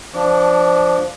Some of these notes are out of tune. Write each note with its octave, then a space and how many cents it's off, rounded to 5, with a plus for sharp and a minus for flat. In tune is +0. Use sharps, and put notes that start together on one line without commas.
F3 +0 D4 +0 D6 -45